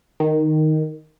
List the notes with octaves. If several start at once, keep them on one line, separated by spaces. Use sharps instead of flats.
D#3